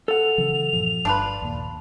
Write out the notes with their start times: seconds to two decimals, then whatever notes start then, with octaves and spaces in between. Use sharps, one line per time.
0.08 A4 F#5 F7
0.38 C#3 E3 F#3
0.73 G2 A#2 F3
1.05 G1 G2 D4 F4 B4
1.42 D#2 A#2